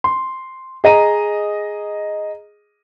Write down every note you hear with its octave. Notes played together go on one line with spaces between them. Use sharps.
C6
G#4 D#5 A#5 D#7